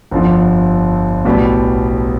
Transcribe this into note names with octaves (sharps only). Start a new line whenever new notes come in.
G1 F2 D3 F3
B1 A2 G3 B3